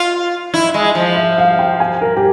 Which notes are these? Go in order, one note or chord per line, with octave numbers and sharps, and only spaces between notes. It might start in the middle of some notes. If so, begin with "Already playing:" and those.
Already playing: F4
E4
G#3
F3
E5
F5
G5
G#5
A#4
G4